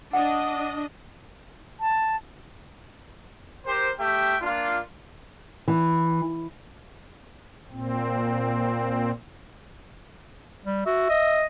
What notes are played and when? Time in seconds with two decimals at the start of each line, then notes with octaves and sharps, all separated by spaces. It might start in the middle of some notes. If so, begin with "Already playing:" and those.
0.13 D4 D#5 F#5
1.80 A5
3.66 G4 A#4 C5
3.99 A3 G4 E5 G5
4.41 A#3 D4 F4
5.68 E3
7.70 A#2 C4
10.65 G3
10.86 F#4 E5
11.10 D#5